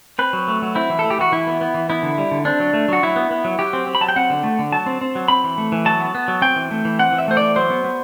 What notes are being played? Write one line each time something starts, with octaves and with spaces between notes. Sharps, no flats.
C4 B4
F#3
A3
F#3
C4 E4
E3
A4
A3
G4
E3 F#4
E3 E4
B3
B3
E3
B3 E4
D3
G3
D3
C4 D4
F#3
A3
F#3 F#4
F#3 E4
B3
B3
F#3
F#3 G4
C4
C4
B5
F#3 A5
G5
C4 F#5
D3
A3
D3
F#3 A5
C4
C4
F#3
C4 B5
E3
A3
E3
F#3 A5
B3
B3
F#3
C4 G5
E3
A3
E3
C4 F#5
E3
E5
A3 C5
E3 D5
F#3 C5
B3
B3